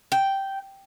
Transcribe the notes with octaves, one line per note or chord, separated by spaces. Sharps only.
G5